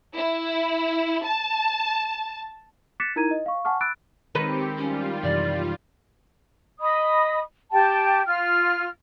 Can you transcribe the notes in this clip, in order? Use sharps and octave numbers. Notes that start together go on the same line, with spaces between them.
E4
A5
D6 F#6 A6 B6 C#7 E7
D#4 E4 A#4 A#5 G#6 D#7
D#5
F5 C#6
F#5 G#5 A5 C#6 D6 F6
B5 D6 E6 F#6 A6 D7
D#3 G#3 C4 G4 B4 C#7
G3 C#4 F4
F#2 C3 E3 D5
D#5 B5 D#6
G4 G5 A5
F4 F6